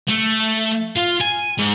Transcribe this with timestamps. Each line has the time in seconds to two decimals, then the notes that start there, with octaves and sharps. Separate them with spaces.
0.09 A3
0.96 F4
1.21 G#5
1.58 G#2